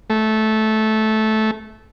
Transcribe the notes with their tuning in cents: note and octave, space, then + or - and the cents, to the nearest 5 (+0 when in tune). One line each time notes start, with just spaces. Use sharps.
A3 -15